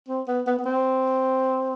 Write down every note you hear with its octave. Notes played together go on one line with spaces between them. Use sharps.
C4
B3
B3
B3
C4